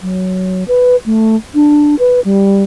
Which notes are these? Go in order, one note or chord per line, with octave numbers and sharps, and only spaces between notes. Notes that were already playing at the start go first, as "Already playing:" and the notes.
F#3
B4
A3
D4
B4
G3